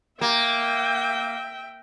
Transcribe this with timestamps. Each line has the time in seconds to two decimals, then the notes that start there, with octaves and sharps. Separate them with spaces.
0.21 A#3 E5 G5